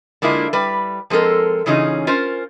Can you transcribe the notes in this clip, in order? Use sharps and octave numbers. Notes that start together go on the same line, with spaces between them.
D3 G#3 A#3 E4 F4
G3 B4
F3 G#3 C4 A4 A#4
C#3 E3 C#4 D#4 F4 G#4
C#4 F4 A#4 C5